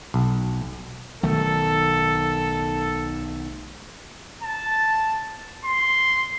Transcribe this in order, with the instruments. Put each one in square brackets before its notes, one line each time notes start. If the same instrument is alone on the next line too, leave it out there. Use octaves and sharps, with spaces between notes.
[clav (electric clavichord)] B1
[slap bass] B1 D#3 A3 [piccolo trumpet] A4
[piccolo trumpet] A5
C6